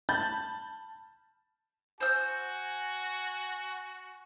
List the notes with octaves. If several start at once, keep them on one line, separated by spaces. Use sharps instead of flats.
A5 B5 G6 A6
F#4 C5 G#5 E6